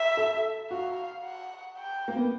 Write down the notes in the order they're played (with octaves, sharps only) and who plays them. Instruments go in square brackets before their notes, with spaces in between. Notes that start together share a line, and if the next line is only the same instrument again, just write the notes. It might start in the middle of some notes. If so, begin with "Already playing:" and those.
Already playing: [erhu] E5
[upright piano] A4
[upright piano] F#4 [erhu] F5
[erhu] F#5
G5
[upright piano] A#3
B3